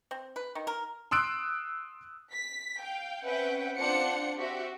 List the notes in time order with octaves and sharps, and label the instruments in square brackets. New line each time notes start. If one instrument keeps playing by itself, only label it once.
[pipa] C4
B4
D#3
A#4
[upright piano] C6 D#6 E6 F#6 D7
[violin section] B6
F5 G5
C4 C#4 B4 E5 F#5 G5
C4 D4 F4 C5 F#5 C#7
F#4 G4 C5 E5